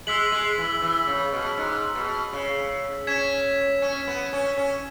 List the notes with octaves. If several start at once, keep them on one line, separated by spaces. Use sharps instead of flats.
G#3 E6 B6 F#7
G#3
E3
E3
C#3
B2
G#2
B2
C#3
C#4 G#6 B6 E7
C#4
B3
C#4
C#4